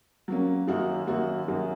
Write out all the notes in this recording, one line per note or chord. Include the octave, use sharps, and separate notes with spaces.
F#3 A#3 C#4
F#2 D#3 A#3 D#4 F#4
F#2 D#3 A#3 D#4 F#4
F#2 D#3 A#3 D#4 F#4